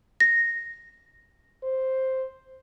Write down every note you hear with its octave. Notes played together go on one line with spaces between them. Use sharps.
A#6
C5